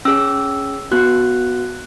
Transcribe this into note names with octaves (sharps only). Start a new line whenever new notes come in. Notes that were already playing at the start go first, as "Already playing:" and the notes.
C#4 G#4 E6
B3 F#4 F#6